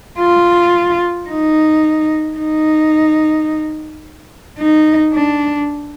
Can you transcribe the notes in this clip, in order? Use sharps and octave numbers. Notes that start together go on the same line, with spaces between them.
F4
D#4
D#4
D#4
D4